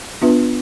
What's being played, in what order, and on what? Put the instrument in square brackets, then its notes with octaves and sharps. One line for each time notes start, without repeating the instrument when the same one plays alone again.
[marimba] B3 D4 F4 B4 E5